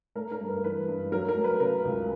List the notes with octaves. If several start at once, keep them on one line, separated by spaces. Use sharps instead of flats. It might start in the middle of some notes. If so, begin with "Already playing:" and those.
A3 A#4
A#4
G2
B4
E3 B4
G2
F#3 A#4
A#4
A3
B4
C#3 A#4
C#2